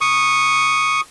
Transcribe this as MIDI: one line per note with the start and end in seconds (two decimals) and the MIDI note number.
0.01 1.01 85
0.01 1.01 87